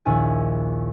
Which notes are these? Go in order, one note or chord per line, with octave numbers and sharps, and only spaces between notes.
A#1 D#2 E4 G#4 G#5 G#6